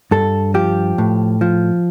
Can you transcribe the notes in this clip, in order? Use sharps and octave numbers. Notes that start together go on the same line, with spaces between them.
G2 A4
F3 G4
A2
F3